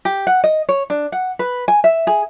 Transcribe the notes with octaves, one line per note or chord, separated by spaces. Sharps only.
G4
F#5
D#5
C#5
D4
F#5
B4
G#5
E5
G#4